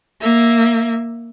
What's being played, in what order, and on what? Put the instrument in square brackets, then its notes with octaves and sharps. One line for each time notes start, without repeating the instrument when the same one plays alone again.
[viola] A#3 E5